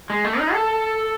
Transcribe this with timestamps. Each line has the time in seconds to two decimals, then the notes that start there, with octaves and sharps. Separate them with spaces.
0.10 G#3
0.24 A3
0.39 D#4
0.53 A4